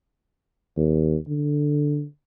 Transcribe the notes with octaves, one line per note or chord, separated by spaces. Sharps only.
D#2
D3